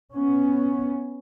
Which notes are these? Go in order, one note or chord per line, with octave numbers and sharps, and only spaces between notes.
B3 C#4